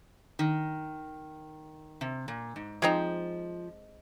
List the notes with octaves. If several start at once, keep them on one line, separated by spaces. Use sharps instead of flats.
D#3
C3
A#2
G#2
F3 G#3 C4 D#4